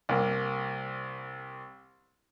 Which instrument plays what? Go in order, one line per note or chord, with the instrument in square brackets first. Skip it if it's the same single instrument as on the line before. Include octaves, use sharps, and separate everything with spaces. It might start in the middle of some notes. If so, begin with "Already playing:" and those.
[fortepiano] C2 A#3